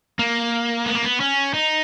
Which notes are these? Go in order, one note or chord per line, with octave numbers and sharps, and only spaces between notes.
A#3
B3
A#3
B3
C#4
D#4